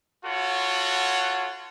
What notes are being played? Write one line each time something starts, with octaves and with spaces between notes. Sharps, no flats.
F4 F#4 A4 C#5 F#5